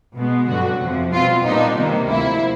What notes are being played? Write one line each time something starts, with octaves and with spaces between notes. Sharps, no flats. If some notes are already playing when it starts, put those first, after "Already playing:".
B2 G#3 B3
G2 D3 F#3 F#4
F2 C3 F3
B2 G3 C4 F4
A#2 G3 B3 D4 D#4
C3 D#3 G3 A#3
D2 C3 F3 E4